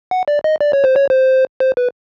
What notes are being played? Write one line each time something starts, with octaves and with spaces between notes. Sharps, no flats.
F#5
D5
D#5
D5
C#5
C5
C#5
C5
C5
B4